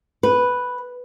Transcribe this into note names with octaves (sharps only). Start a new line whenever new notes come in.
B4